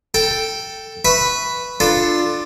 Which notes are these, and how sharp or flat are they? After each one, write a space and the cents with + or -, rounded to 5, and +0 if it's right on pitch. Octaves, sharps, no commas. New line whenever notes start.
A4 +5 G5 -5
B4 +0 E5 +0 C#6 +0
D4 +20 F4 +0 A4 +0